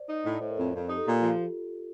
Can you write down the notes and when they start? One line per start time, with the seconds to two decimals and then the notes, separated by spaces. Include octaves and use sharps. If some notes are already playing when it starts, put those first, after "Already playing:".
Already playing: C5 D5
0.08 D#4
0.25 A2 D#5
0.33 D5
0.41 A2 C5
0.49 A#4
0.57 F2 A4
0.74 F2
0.90 D#4 G4
0.97 A4
1.05 A#2 G4
1.22 F3 F4
1.33 F4